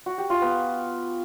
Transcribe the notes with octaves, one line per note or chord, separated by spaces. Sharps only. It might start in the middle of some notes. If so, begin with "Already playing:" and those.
F#4
G4
F4
B3